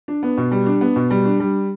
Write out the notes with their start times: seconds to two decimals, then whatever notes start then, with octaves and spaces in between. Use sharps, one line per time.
0.08 D4
0.23 B3
0.37 B2
0.51 G3
0.66 D4
0.81 B3
0.96 B2
1.11 G3
1.25 D4
1.40 G3